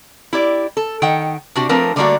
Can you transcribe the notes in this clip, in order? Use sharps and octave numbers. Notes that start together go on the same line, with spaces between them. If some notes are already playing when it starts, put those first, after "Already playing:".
E4 G4 D5
A4
D#3 F#5 G5
C3 D4 F#4 G4
F3 A3 C4 D4 A#4 B4
D3 G3 A3 A#3 D4 F#4